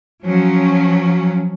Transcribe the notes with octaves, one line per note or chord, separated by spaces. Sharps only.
F3 F#3 C#4